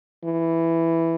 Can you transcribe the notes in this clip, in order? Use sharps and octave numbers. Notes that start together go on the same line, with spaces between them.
E3